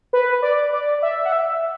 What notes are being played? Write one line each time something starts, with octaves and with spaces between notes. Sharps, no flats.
B4
D5
D5
E5
F#5
E5